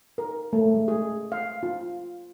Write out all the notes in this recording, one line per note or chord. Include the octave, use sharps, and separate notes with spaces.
A#4
A3
G#3
G#4
F5
F4